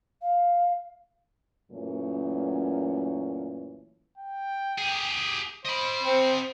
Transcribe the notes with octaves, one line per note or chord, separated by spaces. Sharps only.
F5
F#2 A#2 E3 F#3 A3 C#4
G5
G4 G#4
C5 D#5 B5
C4